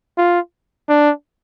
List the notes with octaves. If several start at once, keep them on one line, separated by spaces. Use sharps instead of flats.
F4
D4